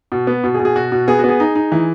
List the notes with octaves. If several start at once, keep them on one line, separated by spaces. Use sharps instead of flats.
B2
B3
B2
G#4
B2
G#4
B2 F#4
B2
B3 G#4
F#4
B3 G#4
D#4
D#4
E3